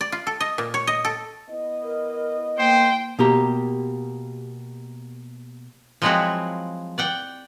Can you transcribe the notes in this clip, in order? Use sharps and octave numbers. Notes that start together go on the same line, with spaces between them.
D5
F4
A4
D#5
A#2
C#5
D#5
A4
B3 E4 D#5
A#4
A#3 C5 G5
B2 A#3 G4 A#5
F3 F#3 G#3 C4 E4 F#4
D5 F#5 G5